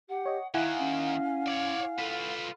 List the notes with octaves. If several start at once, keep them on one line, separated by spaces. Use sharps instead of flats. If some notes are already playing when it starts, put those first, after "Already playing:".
G4 F#5
C#5 D#5
D#2 D#3 E4 F5 F#5 G#5 F#6
C#4
C#5 D5
F4 A4 B4